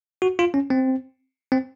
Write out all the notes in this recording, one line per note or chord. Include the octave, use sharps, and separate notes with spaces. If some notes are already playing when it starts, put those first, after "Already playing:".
F#4
F4
C#4
C4
C4